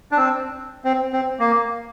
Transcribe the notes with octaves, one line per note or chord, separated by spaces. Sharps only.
D4
C4
C4
C4
A#3